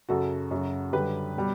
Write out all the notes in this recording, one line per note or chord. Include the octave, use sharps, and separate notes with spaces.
F#2 C#3 F#3 F#4 A4
F#2 C#3 F#3
F#2 D3 G3 G4 B4
B2 G3